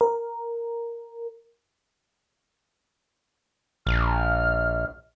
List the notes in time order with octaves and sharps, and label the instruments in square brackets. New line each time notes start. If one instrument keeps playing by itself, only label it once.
[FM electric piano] A#4
[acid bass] A#1 [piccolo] F6